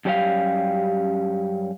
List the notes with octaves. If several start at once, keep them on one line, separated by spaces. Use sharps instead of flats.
F#2 G3 C#4 F#4 G4 F5